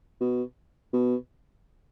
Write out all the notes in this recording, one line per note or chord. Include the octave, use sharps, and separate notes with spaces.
B2
B2